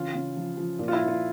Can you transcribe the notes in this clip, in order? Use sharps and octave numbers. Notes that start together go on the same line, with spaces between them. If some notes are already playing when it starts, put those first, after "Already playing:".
Already playing: C#3 E3 F4
C#3
F3
F3
A#2
F4
E4
A#2
F4